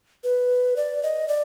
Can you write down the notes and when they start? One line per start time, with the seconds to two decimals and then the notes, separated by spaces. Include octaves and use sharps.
0.24 B4
0.76 D5
1.03 D#5
1.28 D5